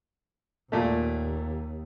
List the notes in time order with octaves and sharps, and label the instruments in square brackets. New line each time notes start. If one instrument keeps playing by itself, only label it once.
[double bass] D#2 [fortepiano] A#2 A3